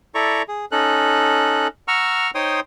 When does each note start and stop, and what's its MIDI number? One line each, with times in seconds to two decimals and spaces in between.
0.15 0.42 64
0.15 0.42 69
0.15 0.42 74
0.15 0.42 82
0.15 0.42 85
0.48 0.65 68
0.72 1.68 61
0.72 1.68 63
0.72 1.68 69
0.72 1.68 90
1.88 2.31 78
1.88 2.31 82
1.88 2.31 85
1.88 2.31 88
1.88 2.31 89
2.35 2.60 63
2.35 2.60 72
2.35 2.60 73
2.35 2.60 79
2.35 2.60 84
2.35 2.60 87